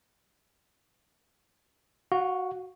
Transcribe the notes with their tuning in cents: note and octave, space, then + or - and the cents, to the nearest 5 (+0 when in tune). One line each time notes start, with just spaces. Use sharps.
F#4 +0 F5 +30